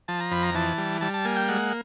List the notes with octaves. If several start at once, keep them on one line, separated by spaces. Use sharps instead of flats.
F3 A5
A#5
F2 B5
A#5
E3 A5
G3
G3 A5
A5
A#3 G#5
G5
G#3 F#5